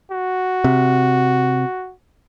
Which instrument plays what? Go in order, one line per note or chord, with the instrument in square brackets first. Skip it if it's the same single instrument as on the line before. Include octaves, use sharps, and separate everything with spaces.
[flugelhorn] F#4
[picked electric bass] C3